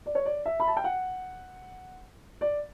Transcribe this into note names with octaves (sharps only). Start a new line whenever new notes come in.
D5
C#5
D5
E5
B5
A5
G5
F#5
D5